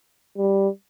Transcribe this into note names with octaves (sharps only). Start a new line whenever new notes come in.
G3